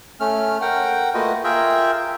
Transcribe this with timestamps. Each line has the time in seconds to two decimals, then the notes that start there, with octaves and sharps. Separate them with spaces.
0.20 A3 C#4 F6
0.62 A#4 F#5 G5
1.14 A3 A#3 F4 F#4 B4 D#5
1.44 F4 G#4 A#4 E5 G5